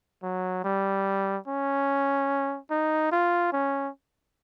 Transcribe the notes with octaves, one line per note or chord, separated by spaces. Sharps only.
F#3
G3
C#4
D#4
F4
C#4